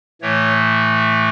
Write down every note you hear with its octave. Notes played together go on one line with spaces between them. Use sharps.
A2 E3 A3 C#5